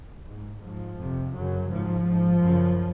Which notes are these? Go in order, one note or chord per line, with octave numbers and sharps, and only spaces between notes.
G#2
G#2 F3
F2 C3
F#2 C#3 F#3
G#2 F3
G#2
F#2 C#3